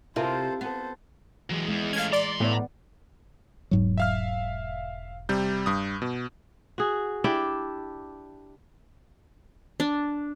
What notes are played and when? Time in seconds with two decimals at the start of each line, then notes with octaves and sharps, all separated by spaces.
0.16 C3 E4 F4 A4 A#4 C5
0.61 B3 A4 C5
1.50 E3 F#3 G#3
1.69 E2 G#3
1.93 A3 C#4 F5 G#6
2.13 D5 A#5 C6
2.40 A2 B3 D5
3.71 E1 G#2 F#3
3.98 E5 F5 F6
5.29 C3 G3 G6
5.66 G2 D#6
6.02 B2
6.78 F#4 G#4
7.24 D4 E4 G4 D5
9.80 D4